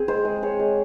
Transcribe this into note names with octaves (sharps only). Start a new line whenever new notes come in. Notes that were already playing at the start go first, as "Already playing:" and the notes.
Already playing: C4 G#4
G#3 C5
G#3
G#3 C#5
G#3